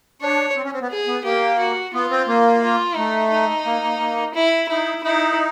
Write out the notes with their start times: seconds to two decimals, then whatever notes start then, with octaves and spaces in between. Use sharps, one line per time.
0.21 D4 C#5
0.56 C4
0.65 C#4
0.73 C4
0.82 B3
0.90 G#4
1.07 B3
1.24 A#3 G4
1.59 F#4
1.94 B3 F4
2.10 C4
2.28 A#3
2.62 F4
2.96 A3 D#4
3.31 D#4
3.65 A#3
3.83 A#3
4.00 A#3
4.34 E4
4.69 D#4 E4
5.03 D#4 E4